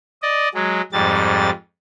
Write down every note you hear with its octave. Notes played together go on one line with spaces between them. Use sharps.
D5 D#5
F#3 G#3
F2 G#2 G3 A6